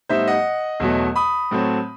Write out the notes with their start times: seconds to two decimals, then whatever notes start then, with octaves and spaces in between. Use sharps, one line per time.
0.09 A2 G3 B3 D#4 C5 E5
0.27 D#5 F#5
0.80 E2 B2 F#3 A3
1.16 B5 D#6
1.51 A2 F#3 A3 C4